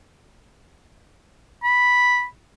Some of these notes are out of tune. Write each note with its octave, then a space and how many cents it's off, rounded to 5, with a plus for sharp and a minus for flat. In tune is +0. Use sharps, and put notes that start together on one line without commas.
B5 -5